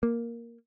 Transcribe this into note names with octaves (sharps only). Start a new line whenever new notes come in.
A#3